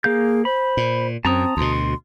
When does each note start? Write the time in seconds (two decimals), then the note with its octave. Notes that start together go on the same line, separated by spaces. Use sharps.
0.04 A#3 G#4 F5 G6
0.45 C5 B5
0.77 A#2
1.25 F#2 C4 A5 A#5 D#6
1.57 D2 B2 C6